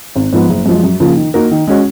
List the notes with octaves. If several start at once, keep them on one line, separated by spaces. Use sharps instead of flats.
G#1
G#2 F3 B3
F#1
F#2 F3 G#3
F#2
C#3 F3 A#3 F4
D#3
A#3 D#4 F#4 A#4
D#3
G#3 C#4 F#4